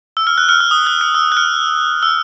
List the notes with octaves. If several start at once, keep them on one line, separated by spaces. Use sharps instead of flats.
E6
F6
F#6
F6
E6
D#6
F#6
F6
E6
F#6
F6
E6